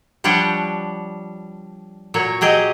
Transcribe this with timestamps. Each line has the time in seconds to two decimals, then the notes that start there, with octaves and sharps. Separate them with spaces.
0.24 F3 G3 D4 C#5 F#5 G5
2.14 A#2 F#3 C#5
2.41 F#3 G4 G#4 D#5